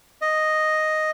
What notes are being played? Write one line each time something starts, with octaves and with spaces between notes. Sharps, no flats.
D#5